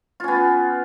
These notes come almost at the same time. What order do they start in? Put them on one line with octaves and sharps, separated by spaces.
F4 C#4 B3